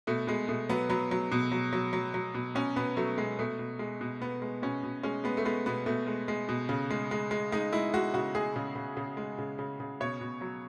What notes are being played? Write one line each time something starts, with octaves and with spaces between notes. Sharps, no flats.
B2 A3
B2 G#3
B2 A3
F#3 B3
F#3 B3
F#3
B2
F#3
F#3
F#3
F#3
B2
B2 C#4
B2 B3
F#3 A3
B2 G#3
B2 A3
B2
G#3
B2
B2 B3
G#3
B2 C#4
B2
G#3 C#4
G#3 B3
A3
G#3 B3
B2 B3
B2 A3
G#3
G#3
B2
C#3
G#3
G#3
G#3
G#3 D#4
G#3 E4
G#3 F#4
C#3 F#4
G#3 G#4
C#3
C#3
C#3
G#3
C#3
C#3
C#3
B2 C#5
B2
F#3